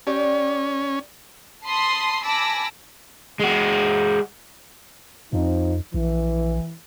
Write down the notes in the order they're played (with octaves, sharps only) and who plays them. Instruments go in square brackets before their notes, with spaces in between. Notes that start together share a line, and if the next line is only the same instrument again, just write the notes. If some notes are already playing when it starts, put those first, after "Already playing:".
[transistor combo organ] C#4 [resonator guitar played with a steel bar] G4 D5
[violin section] A5 B5 C6 D#6 C7
G#5 A5 B5 D6 E6 A#6
[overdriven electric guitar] G#3 F#4
[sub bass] F2 [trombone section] F3 C4 D#4
[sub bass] A#1 [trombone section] E3